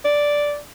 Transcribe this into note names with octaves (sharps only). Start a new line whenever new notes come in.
D5